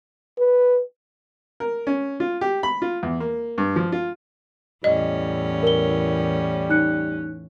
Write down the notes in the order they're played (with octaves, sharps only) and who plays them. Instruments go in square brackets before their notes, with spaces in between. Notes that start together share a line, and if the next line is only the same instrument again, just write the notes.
[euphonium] B4
[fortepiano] A#4
C#4
F4
G4
B5
F4
E2
A#3
G2
F3
F4
[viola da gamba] E2 A2 C#4 [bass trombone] G3 [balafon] D#5
[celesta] A#4 G7
D#4 F#6 C#7